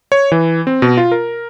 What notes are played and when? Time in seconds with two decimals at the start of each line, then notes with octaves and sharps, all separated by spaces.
0.12 C#5
0.32 E3
0.67 C4
0.82 B2
0.97 F4
1.12 A#4